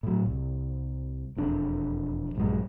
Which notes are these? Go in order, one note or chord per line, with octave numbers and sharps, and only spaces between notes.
A2 F#3
C2
E1 F2 D4
A#1 G2 F#3 G#3